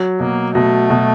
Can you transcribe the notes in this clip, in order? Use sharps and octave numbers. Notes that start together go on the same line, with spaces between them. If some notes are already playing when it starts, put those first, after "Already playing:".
Already playing: F#3
B2 A#3
B2 A3
B2